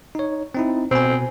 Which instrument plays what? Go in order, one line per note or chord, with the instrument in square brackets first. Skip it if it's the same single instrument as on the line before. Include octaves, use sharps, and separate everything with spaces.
[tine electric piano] D#4 C#5
C4 D#4 E4
[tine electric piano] B2 G#5 [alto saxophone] C4